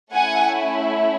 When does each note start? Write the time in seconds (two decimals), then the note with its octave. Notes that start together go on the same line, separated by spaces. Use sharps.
0.14 A3 C#4 E4 F#5 G#5